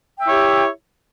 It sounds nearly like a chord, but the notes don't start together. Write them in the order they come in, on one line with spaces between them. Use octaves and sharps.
G5 E5 E4 C#5 G4